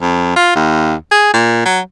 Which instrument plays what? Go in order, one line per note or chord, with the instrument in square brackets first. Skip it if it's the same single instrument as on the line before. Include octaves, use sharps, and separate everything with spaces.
[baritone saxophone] F2
F4
D#2
G#4
A#2
F#3